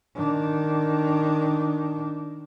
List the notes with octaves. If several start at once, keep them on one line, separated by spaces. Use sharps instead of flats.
D#3 D4